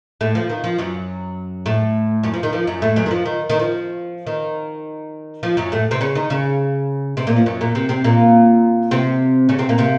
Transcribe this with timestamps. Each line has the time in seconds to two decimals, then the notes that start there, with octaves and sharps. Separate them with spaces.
0.21 A2 A3
0.35 F3
0.49 D#3
0.64 F3
0.78 F#2 F#3
1.66 A2 A3
2.23 F#2 F#3
2.34 F3
2.43 D#3
2.53 F3
2.67 F#2 F#3
2.82 A2 A3
2.96 F#2 F#3
3.06 D#3
3.11 F3
3.26 D#3
3.50 D#3
3.59 F3
4.27 D#3
5.43 F3
5.57 F#2 F#3
5.72 A2 A3
5.91 C3 C4
6.01 C#3 C#4
6.15 D#3 D#4
6.30 C#3 C#4
7.17 C3 C4
7.27 A#2 A#3
7.36 F3
7.46 F#2 F#3
7.61 A#2 A#3
7.75 C3 C4
7.89 C3 C4
8.04 A#2 A#3
8.91 C3 C4
9.49 C#3 C#4
9.59 C3 C4
9.69 A#2 A#3
9.78 C3 C4